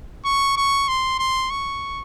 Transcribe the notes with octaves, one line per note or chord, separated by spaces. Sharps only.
C#6
C#6
C6
C6
C#6